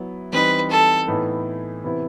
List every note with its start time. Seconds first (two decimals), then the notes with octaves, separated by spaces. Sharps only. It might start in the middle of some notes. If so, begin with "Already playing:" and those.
Already playing: F#3 B3 E4
0.32 E3 G3 C4 D#4 B4
0.70 A4
1.08 A2 E3 B3 D#4
1.84 C3 E3 B3 E4